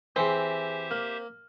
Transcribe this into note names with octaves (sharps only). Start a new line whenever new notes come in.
E3 C4 G4 G#4 C5 E5 G#5 B6
A#3 F6